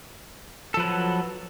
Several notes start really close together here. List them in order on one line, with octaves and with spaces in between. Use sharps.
A4 F3 B4 F#3